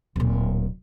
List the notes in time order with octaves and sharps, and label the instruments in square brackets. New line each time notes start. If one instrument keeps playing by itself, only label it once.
[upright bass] D1 A#2